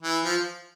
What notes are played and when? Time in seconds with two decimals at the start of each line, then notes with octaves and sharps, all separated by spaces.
0.02 E3
0.24 F3